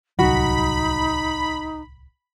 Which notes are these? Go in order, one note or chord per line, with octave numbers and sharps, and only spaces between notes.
D1 C2 F#3 D#4 F#4 B5